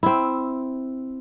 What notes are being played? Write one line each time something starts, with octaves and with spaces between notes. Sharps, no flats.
C4 E4